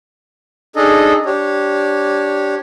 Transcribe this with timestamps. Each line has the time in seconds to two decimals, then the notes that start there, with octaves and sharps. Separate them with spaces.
0.76 D4 D#4 G#4 A4 D#5
1.26 D4 G4 C#5